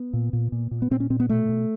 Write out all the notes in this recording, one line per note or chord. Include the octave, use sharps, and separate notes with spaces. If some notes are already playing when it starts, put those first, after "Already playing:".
Already playing: B3
A#2
A#2
A#2
A#2
B3
A#2 C4
C#4
A#2 C4
B3
B2 A3
B2